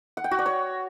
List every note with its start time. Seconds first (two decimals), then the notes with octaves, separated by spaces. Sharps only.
0.17 F#5
0.24 G5
0.31 F#4
0.39 D5
0.46 C#5